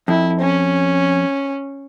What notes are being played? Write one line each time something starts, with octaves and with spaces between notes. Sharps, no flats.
F2 E4
C#4